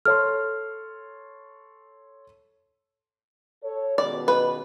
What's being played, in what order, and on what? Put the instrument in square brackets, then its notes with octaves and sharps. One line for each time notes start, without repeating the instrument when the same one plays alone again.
[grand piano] A4 C#5 C6 [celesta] F6
[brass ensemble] A4 C#5
[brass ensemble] C#2 B2 D#3 [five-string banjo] D5
[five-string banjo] B4